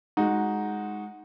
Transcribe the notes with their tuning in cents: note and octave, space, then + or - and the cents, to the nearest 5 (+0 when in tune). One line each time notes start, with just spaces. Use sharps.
G#3 +0 D#4 +0 F#4 -5